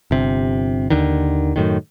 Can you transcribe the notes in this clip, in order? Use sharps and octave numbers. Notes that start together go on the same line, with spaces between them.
G1 C3
D#2 D3 D#3
F#2 A2 D#3